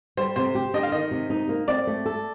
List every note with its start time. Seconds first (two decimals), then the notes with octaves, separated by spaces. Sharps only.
0.17 G3 C5
0.36 C3 C5
0.55 G4
0.74 D4 D#5
0.83 F5
0.92 D#3 D#5
1.11 C3
1.30 D#4
1.49 A#3
1.68 C4 D5
1.87 A3
2.06 A4